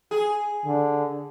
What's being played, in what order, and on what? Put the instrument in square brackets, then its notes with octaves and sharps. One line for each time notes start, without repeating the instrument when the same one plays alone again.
[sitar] G#4
[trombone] D3